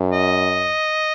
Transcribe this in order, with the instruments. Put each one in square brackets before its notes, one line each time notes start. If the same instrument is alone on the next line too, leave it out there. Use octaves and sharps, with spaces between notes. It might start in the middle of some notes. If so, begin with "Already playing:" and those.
Already playing: [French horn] F#2
[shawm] D#5